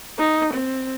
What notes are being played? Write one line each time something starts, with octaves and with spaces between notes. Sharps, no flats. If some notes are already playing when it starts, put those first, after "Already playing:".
D#4
C4